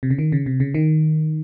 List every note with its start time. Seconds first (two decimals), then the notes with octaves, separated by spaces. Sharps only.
0.03 C3
0.10 C#3
0.19 D#3
0.32 C#3
0.46 C3
0.60 C#3
0.74 D#3